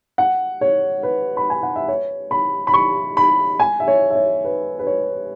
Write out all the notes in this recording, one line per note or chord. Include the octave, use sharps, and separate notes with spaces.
F#5
C#5
B4
B5
G#5
F#5
E5
C#5
B5
B5
C#6
B5
G#5
E5
C#5
E5
C#5
B4
B4
C#5